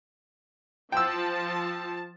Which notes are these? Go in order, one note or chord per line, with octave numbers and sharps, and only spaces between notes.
F3 G5 A5 E6